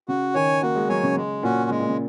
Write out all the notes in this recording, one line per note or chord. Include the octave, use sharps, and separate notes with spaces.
C#3 F#4
D#3 C#5 G#5
A#3 F#4
G#3
F#3 C#5 G#5
C#3
C#3 G#3
A#2 C#4 F#4
C#3 G#3
A#2
C#3